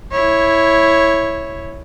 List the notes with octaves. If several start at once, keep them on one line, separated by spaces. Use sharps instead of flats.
E4 C#5